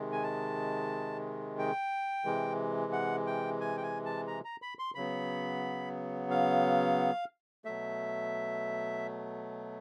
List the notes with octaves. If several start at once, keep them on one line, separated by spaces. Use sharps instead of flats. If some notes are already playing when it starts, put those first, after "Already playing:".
Already playing: C3 D#3 G#3
G#5
A5
G5
C3 E3 G#3
F#5
G5
G#5
G5
G#5
A5
A#5
A#5
B5
C6
C#3 F#3 B3 B5
F5
B2 F#3 A3 E5